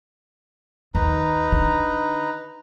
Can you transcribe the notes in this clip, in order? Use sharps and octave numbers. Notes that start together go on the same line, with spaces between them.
D#2 D#4 B4 A#5
D3